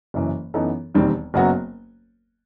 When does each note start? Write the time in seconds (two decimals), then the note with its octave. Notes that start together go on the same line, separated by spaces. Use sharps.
0.14 F#1 F#2 E3
0.54 F#2 E3 B3 D#4 A4
0.95 E1 D#2 D#3 G3 C4
1.34 F#1 F#2 F#3 B3 F#4